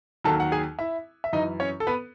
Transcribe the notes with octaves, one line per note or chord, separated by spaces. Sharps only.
D#2 D#3 F#3 A4 A5
F#5
G#4 G#5
E4 E5
E5
F#2 E3 D#4 D#5
C#4 C#5
A4
B3 B4